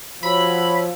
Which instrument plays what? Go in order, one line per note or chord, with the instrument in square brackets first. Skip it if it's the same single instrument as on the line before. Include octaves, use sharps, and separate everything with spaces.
[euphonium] F3 [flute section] F#4 C#5 E6 [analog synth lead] B5